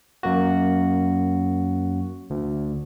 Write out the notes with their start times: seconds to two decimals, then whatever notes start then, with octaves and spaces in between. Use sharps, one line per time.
0.23 F#2 A#3 F#4
2.30 D2